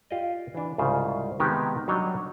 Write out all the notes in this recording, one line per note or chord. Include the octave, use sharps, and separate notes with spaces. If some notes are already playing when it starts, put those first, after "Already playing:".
F4 G4 D5 D#5
E3 D4
C2 G#2 C#3 F4 C5
C3 D#3 G#3 B3 D#4 G4
F#3 G3 D4 D#4 C#5 D#5